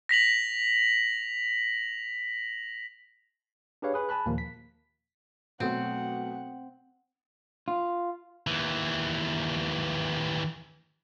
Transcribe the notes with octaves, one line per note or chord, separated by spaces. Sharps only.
A#6 B6 F7 F#7
D4 G4 G#4 B4 C#5 F5
G#4 B4 G#5
G#5 A5 B5 F#6
D#2 A#2 F3 A#3
B6
B2 F#3 A3 C4 F#5
F4
D#2 E3